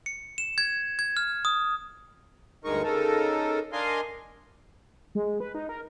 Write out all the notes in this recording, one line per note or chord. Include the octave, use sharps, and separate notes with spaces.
C#7
E7
G#6
G#6
F6
D#6
D2 G2 G#3 D#4 A#4 C#6
C#3 D#4 A4 A#4
D4 A#4 D#5 F5 G#5 C6
G#3
B4
D#4
A#4